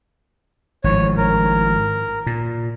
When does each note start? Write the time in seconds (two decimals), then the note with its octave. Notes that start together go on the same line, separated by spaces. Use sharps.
0.84 G#1 A2 F3 C#5
1.17 A#4
2.26 A#2